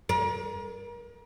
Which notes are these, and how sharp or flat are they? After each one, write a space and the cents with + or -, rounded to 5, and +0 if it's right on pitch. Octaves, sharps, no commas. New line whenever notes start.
A#4 +35